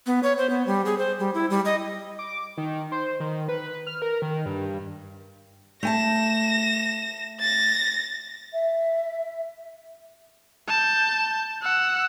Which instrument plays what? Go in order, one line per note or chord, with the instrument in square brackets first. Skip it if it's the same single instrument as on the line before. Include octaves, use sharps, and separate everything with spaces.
[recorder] B3
C#5
C5
B3
G3
G#4
C5
G3
E4
G3
D#5
[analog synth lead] D6
D#3
C5
D#3
B4
F6
A#4
D#3
G2
[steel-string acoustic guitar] A3 G#5 A5 [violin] A#6 E7
[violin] A6 A#6
[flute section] E5
[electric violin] A5 G6
F#5 E6